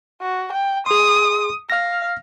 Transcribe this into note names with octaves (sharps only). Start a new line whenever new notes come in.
F#4
G5
G#4 C6 D#6
F5 F6 A#6